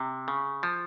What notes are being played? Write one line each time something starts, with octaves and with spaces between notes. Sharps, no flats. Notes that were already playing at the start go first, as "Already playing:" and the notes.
Already playing: C3
C#3
F3